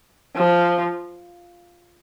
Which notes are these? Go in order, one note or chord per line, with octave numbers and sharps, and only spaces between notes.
F3